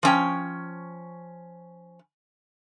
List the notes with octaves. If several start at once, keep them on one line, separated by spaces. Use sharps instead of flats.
F3 C#4 G5